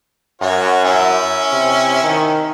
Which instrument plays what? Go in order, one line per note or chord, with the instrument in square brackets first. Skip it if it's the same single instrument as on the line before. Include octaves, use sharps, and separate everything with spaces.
[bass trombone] F#2 [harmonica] F#4 C#5
[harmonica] C#4 E4
[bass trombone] C3
D#3